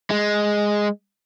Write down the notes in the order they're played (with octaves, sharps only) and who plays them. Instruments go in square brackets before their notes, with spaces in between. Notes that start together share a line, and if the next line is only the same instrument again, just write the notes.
[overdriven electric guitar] G#3